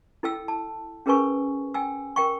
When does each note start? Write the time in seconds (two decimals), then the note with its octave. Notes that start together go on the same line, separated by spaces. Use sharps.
0.23 E4 A4 G5 E6
0.48 A5
1.06 C#4 G#4 A#4 B4 G#5 C#6
1.74 G5 G#5 E6
2.16 A#4 G5 C#6